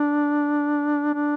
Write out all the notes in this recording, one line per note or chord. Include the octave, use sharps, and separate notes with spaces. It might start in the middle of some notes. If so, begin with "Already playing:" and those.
Already playing: D4
D4